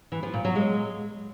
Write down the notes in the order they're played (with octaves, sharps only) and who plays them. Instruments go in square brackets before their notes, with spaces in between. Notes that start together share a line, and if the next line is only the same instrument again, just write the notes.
[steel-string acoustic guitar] E3
F3
A#2
F#3
G#3